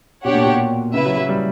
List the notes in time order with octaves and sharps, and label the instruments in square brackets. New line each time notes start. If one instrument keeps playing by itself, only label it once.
[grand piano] B2 [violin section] D4 G4 C#5 F#5
[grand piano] A#2
B2
[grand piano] C#3 [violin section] E4 B4 E5
[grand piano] F#3
F#3
G3